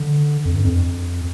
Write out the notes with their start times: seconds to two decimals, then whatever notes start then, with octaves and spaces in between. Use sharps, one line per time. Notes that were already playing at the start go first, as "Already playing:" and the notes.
Already playing: D3
0.45 F2
0.55 G2
0.65 F2